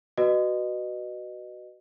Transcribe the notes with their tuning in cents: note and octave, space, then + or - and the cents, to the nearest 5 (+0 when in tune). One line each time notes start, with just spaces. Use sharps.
F#4 +15 B4 +0 D#5 -25